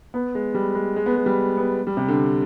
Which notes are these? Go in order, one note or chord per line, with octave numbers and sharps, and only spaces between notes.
B3
G#3
G3
G#3
G#3
B3
G#3
G3
B3
G3
C3
D3